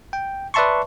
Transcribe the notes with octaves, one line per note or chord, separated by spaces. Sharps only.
G5
B4 D5 E5 A5 C6 C#6